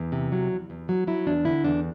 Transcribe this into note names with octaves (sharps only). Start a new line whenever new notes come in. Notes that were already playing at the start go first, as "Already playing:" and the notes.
Already playing: E2
C3
F#3
E2
E2
F#3
F#3 E4
E2 D4
D3 E4
E2 D4